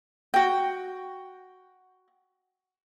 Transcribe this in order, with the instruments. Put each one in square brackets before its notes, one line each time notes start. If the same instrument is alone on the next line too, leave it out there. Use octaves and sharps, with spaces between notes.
[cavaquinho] F#4 G5